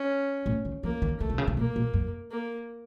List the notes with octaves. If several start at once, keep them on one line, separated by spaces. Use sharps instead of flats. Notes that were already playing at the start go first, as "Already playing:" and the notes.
Already playing: C#4
A2
D#3
F3 A#3
D#3
C#3 A3
C3
C#3
C3
A#2 A#3
A#2
F#2
A#3